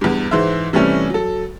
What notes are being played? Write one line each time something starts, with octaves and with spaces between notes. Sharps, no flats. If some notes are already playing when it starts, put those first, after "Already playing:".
E2 G2
G#2 E3 C5 E5
C3 E3 G3 A3 C#4
F#3 A4